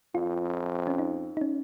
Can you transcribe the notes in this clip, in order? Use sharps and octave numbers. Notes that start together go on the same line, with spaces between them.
F2 F4
C#4
D#4
D#4
C#4